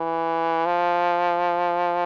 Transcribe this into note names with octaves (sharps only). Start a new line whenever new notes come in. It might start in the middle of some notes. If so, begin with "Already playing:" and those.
Already playing: E3
F3